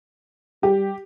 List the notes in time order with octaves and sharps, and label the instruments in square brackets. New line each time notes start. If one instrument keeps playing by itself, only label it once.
[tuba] G3 [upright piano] G4